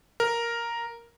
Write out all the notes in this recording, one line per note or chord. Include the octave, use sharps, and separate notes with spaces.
A#4